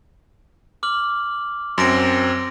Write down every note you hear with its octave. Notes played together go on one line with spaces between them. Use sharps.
D6 F6 F#7
F#2 C4 C6 A#6 D7